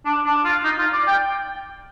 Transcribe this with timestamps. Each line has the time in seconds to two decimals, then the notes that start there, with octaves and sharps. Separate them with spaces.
0.05 D4
0.26 D4
0.45 F4
0.64 D#4
0.79 F4
0.93 D5
1.08 G5